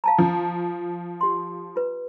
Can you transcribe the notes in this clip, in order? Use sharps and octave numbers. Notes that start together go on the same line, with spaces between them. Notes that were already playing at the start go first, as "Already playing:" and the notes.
F5 A5 A#5
F3
G4 C6
F4 B4